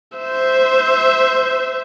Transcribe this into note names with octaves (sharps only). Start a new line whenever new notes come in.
C5 E5